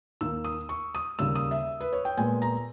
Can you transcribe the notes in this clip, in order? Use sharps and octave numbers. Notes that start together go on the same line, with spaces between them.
D#2 D#3 A#3 E6
D#6
C#6
D#6
D#2 C#3 G3 A#3 E6
D#6
E5
B4
C#5
G5
A#2 G#3 B3 G#5
A#5